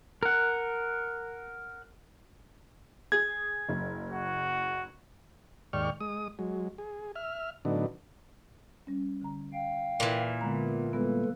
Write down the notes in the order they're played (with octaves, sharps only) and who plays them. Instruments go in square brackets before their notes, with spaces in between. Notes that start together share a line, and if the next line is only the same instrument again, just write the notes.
[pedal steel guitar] A#4 F#5
[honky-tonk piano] G#4 [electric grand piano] G#6
[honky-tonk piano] F#1
[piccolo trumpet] F#4
[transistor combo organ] D#2 G#2 D5 G5 C#6 F6
G#3 D#6
F#3 G#3
G#4
E5 F6
A2 D3 F#3 B3 D4 D#4
[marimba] G3 C#4
D3 A#5
[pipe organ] F5 G5
[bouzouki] A#2 E3
[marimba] D3 G#3 A#5 [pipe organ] B3
[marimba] G3 G#3 B3 [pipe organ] A#3 A4 B4